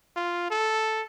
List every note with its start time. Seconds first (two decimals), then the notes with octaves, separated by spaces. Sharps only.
0.16 F4
0.51 A4